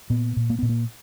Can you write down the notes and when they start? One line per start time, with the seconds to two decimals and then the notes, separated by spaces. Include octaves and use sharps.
0.10 A#2 B3
0.36 A#2
0.50 A#3
0.59 A#2 B3
0.69 A#3